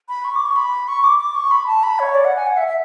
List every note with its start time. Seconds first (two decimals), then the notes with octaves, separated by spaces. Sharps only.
0.09 B5
0.24 C#6
0.35 D6
0.46 C#6
0.56 B5
0.88 C#6
1.04 D6
1.19 D6
1.35 C#6
1.51 B5
1.67 A5
1.83 B5
1.99 C#5
2.15 D5
2.25 F#5
2.36 G#5
2.47 F#5
2.57 E5
2.68 E5